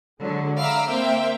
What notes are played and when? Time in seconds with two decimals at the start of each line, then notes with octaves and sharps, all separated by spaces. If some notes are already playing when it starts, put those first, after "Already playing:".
0.20 D3 F#3 G#3
0.58 E5 F5 A#5 B5 D6 E6
0.89 A#3 C4 E5 F5 G5